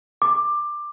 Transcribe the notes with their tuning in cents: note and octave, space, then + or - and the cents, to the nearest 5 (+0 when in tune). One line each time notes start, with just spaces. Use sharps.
D6 +15